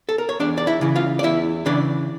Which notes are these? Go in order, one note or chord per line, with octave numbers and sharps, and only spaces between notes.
A4
A#4
C#5
E2 D4 D5
D5
E4 E5
C#3 E3
F4 F5
D5
E2 E4 E5
C#3 E3 D4 D5